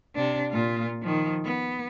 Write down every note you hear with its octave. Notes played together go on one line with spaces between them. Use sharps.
C3 D4
A#2 F4
D#3 F3
B3